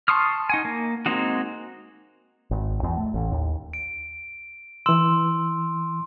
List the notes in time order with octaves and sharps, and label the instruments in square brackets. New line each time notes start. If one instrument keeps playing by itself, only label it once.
[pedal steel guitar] A5 C6 C#6 D#6 F6
D#4 F#5 G#5
A#3
G#3 A#3 C4 D#4 F#4
[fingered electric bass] G#1
E2
A3
A1
D#2
[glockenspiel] D7
[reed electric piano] E3 E6 [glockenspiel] C6